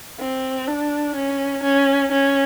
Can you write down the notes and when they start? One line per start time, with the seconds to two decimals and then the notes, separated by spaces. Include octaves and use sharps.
0.20 C4
0.68 D4
1.15 C#4
1.63 C#4
2.11 C#4